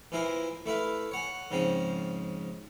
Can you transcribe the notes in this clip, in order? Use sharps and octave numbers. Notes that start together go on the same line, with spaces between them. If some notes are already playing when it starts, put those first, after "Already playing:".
A#2 E3 E4 A#4 C5 G#5
A3 E4 B4 F5
C#5 F#5 G#5
G#2 C#3 F3 C4